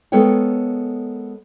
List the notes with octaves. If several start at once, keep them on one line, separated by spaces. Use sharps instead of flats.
G#3 B3 A4 A#4 C#5 G5